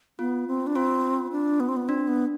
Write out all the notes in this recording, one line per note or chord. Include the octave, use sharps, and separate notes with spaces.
B3 F4
C4
D4
C4 F4
D4
B3
C4
B3
C4 D4
B3